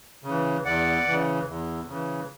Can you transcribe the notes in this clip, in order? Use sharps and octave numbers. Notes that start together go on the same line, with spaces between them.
C#3 E3
E2 D5 F#5
C#3 E3
E2
C#3 E3